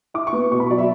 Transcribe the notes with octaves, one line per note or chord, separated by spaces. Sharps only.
E4 D6
C#6
B3
B2 C#6
B5
F#3 D5
E5